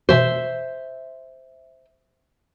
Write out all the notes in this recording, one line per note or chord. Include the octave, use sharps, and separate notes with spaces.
B2 E3 F#4 C5 E5